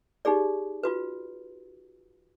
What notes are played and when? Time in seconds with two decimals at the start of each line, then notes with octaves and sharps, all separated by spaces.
0.25 D#4 G4 G#4 D5
0.83 F4 F#4 B4